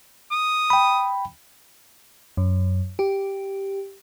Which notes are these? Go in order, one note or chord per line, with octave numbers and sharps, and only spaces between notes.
D#6
G5 B5
F#2
G4